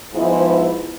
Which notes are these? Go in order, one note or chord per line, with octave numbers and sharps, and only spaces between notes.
G#2 F3 G#3 B3 E4